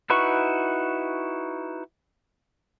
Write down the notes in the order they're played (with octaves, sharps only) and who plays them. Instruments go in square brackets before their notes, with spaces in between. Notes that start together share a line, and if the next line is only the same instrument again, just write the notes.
[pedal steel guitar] D#4 E4 F#4 B4 C#6